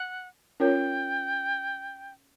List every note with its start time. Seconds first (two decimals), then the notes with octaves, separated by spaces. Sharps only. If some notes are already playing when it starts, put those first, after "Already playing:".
Already playing: F#5
0.60 C#4 F4 A#4 C#5 G5